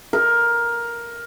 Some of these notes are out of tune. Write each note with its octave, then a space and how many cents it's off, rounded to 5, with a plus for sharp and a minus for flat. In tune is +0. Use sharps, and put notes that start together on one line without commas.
A#4 +10